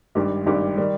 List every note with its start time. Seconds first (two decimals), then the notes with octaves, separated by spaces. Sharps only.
0.15 G#1 G2 G3 G4
0.46 G#1 G2 G3 G4
0.78 D#3 G3